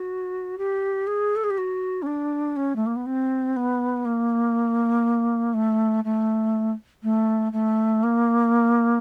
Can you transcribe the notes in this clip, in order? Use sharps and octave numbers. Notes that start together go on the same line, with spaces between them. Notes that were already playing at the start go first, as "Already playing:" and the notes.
Already playing: F#4
G4
G#4
A4
G#4
G4
F#4
C#4
D4
C#4
A3
A#3
B3
C4
B3
A#3
A3
A3
A3
A3
A#3